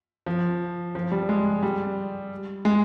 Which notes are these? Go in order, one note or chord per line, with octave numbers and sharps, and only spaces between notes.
F3
F3
G3
G#3
G3
G#3